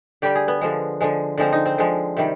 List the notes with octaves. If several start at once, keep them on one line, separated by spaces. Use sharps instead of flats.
D3 G3 G4
G#4
B3
D3 F3 G#3
D3 F3 G#3
D3 F3 G#3 C4
D#4
C4
D3 F3 G#3
C3 D#3 G3